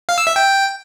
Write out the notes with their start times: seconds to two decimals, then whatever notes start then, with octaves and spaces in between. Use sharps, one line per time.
0.09 F5
0.18 E6
0.27 E5
0.36 G5